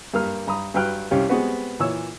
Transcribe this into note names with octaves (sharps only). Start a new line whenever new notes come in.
G2 A#3 F6
G2 A#5 B5 D#6
G2 F#3 B4 G5 F6 F#6
C2 C#4 G4 F5
G3 G#3 B3 C4 F#4 B4
A#2 E3 C#5 E6